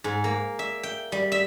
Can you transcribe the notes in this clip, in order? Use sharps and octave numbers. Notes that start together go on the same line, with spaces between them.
G#2
A#3
E5
G5
G3
E5